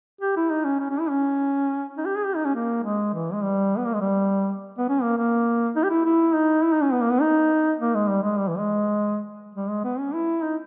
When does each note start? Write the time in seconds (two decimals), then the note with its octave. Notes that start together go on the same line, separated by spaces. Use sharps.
0.21 G4
0.36 E4
0.50 D#4
0.65 C#4
0.80 C#4
0.90 C#4
1.00 E4
1.10 C#4
1.97 D#4
2.06 G4
2.16 G#4
2.25 G4
2.36 D#4
2.45 C#4
2.55 A#3
2.83 G#3
3.14 E3
3.33 G#3
3.43 G3
3.78 B3
3.86 A#3
3.94 G#3
4.01 G3
4.78 B3
4.89 C#4
5.02 A#3
5.17 A#3
5.76 D#4
5.84 G4
5.90 E4
6.05 E4
6.34 D#4
6.63 E4
6.73 D#4
6.83 C#4
6.92 B3
7.02 A#3
7.12 B3
7.21 D#4
7.81 A#3
7.95 G#3
8.09 G3
8.23 G#3
8.39 G3
8.48 E3
8.58 G#3
9.55 G3
9.69 G#3
9.84 B3
9.99 C#4
10.14 E4
10.42 D#4